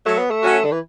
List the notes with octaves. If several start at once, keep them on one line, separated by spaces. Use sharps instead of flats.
F#3 A3
B3
A3
C#4 F#4
D3
E3